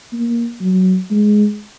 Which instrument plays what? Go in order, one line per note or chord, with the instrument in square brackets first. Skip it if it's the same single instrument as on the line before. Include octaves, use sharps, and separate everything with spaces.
[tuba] A#3
F#3
G#3